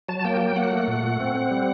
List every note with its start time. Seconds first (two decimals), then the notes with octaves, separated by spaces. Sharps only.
0.09 F#3 A5
0.19 A5
0.25 A#3 G5
0.41 F#3 G5
0.56 A#3 F#5
0.72 A3
0.88 A#2
1.04 A3
1.20 C4
1.35 C4
1.51 G3